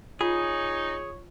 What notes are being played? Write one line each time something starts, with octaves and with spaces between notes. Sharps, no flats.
D#4 F4 G#4 C#5